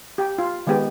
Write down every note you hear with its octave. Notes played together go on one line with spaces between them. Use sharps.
G4
F4
D#3 G#3 B3 G4